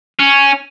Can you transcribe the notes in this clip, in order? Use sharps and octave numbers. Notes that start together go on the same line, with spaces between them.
C#4